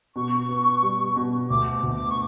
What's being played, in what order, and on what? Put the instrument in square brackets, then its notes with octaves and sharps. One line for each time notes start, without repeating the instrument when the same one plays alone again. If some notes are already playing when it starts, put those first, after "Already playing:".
[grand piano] B2 [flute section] C#6
[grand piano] B3
G3
B2
[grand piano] D2 [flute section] D6
[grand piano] D2
[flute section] D6
C#6